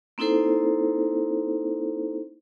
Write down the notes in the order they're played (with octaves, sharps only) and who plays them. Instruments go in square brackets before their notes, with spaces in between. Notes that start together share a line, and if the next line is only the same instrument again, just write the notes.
[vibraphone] A#3 C4 D#4 E4 A4 C5